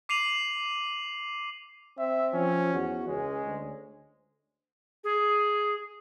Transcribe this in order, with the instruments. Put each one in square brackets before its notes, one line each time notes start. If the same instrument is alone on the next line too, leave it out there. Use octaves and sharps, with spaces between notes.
[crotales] D6 C7 D#7 F7 F#7
[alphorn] C4 [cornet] E5
[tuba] F3 [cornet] C#4
[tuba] E2 [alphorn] F#4
[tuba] C#2 [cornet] G#3 [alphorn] C#4
[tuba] D2
[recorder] G#4